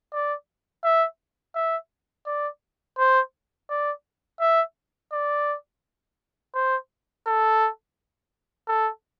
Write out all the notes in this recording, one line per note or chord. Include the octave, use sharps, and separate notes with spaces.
D5
E5
E5
D5
C5
D5
E5
D5
C5
A4
A4